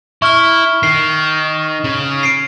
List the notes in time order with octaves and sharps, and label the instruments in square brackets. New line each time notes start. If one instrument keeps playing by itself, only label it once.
[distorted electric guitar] E4 [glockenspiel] C#6 F6 G7
[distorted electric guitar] D#3 [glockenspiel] C7
[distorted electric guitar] C#3
[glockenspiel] C7 D7